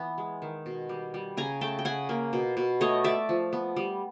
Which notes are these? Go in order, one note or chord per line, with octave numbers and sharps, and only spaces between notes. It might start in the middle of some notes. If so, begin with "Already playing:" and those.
Already playing: E3 B3
G#3
D#3
B2
G3
G3
C#3 G#5 A#5
A3 G5 A5
G5
C#3 F#5 G#5
A#3
B2
B2
A3 C#5 D#5
A3 D5 E5
F3
B3
G3